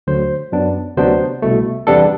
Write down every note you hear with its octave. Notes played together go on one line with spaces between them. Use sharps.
D2 D3 F#3 C5
F#2 F#3 B3 D4
D2 C3 F#3 B3 D4 C5
C2 B2 A3
E2 C3 G3 B3 D4 A4